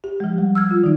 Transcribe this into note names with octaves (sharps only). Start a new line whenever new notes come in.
G4
F3 G#3
G3
E6 F6 G#6
F4
D#3 F#3 D#4